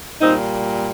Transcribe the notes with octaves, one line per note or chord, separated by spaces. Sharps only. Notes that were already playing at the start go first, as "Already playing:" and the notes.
A#2 G3 C4 D#4